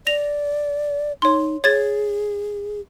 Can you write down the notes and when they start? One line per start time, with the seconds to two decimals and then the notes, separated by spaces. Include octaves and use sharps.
0.07 D5 A#6 F7
1.22 D#4 C#5 C6
1.64 G#4 C#5 G#6 A6